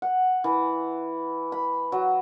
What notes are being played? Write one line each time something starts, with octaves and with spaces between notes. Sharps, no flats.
F#5
E3
B5
F#3